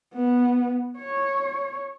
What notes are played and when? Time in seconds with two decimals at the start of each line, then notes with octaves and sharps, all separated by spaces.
0.14 B3
0.98 C#5